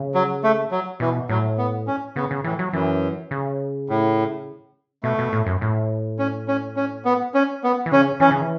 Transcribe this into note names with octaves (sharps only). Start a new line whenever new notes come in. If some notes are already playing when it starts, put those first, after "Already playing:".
Already playing: C#3
F#3
A3
F#3
B2 E3
A2 F#3
B3
C#4
C#3 B3
C#3
A2 E3
F#3
F#2 E3
C#3
A2
B2 A3
B2
A2
F#2
A2
C#4
C#4
C#4
B3
C#4
B3
E3
C#3 C#4
E3 C#4
C#3
E3